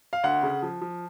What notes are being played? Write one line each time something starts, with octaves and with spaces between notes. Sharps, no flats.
F5
D2 F#5
C#3
F3
F3